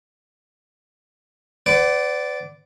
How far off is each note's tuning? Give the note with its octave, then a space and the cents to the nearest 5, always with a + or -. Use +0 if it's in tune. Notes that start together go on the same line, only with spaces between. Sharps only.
B4 +45 D5 -10 F#5 +20